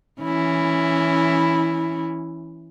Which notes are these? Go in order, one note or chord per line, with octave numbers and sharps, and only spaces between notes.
E3 C#4 E4